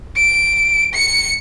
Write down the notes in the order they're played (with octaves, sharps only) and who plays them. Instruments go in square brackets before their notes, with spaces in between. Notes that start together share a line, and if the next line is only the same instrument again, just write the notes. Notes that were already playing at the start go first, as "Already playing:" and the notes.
[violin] D7
C#7